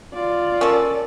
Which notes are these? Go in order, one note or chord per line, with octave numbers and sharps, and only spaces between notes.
F4 D5
C#4 A4 A#4